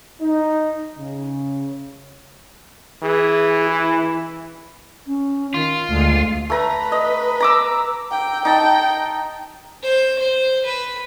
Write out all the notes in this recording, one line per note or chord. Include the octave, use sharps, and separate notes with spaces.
D#4
C#3
E3 G#4
E4
C#4
D#3 F4
D2 G#3
A3 B4 A#5
D#5
A#5 D6 E6
G5
D#4 G5 A5
C5
C5
B4